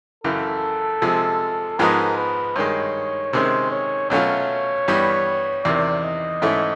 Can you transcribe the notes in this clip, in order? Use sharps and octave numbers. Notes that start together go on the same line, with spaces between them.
F#2 C#3 E3 A4
C3 F3 G#3
G#2 F3 G#3 B3 D#4 A#4
B4
G2 D#3 G#3 C#5
C3 D#3 G#3 C#4 C5
C#5
B2 F#3 A3 C#4 F4 C#5
G2 E3 G3 B3
E2 C3 D#3 D5
D#5
G#2 E3 A3 C#4 E4